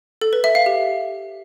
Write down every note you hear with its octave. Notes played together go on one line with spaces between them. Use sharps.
A4
B4
E5
F5
G4